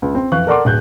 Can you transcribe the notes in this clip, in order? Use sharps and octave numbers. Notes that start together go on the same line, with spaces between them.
C#2
C4
F2 E3 F5 C#6 F#6
A4 A#4 D5 F#5 C6 D6
D1 F#6 G6